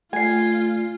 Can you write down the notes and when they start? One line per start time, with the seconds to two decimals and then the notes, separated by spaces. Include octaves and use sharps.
0.13 A3 F4 D5 G#5 C7